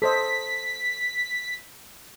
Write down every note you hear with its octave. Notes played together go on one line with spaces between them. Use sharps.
A4 C5 D#5 B6